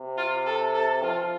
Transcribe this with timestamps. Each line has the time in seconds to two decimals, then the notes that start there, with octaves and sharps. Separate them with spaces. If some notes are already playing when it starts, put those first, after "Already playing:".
Already playing: C3
0.18 F4
0.46 A4
0.74 A4
1.03 F3 F4